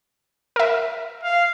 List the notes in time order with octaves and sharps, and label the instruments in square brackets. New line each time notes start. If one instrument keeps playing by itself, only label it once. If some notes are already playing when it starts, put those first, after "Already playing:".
[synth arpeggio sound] A#4 E5
[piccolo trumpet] F5